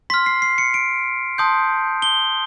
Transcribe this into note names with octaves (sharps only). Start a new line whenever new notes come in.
C6 F6 B6
C7
C7
C#7
D7
A5 C6 D#6 G6
G7